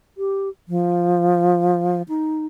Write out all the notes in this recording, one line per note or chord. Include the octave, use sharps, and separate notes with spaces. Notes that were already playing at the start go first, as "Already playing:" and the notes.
G4
F3
D#4